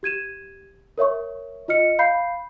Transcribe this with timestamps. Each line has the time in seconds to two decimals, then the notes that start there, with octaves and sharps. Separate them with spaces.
0.03 G4 G#6 D#7 E7
0.98 A#4 C#5 E5 C#6
1.68 F4 D#5 F6 C#7
1.99 F5 B5 G6 C7